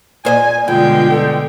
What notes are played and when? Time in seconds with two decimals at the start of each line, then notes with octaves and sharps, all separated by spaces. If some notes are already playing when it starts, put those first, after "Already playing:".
0.25 A#2 C5 D#5 G#5
0.68 G2 B2 D3 G#3 F4 G5
1.10 A4